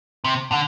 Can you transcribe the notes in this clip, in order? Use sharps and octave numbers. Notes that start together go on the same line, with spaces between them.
C3
D3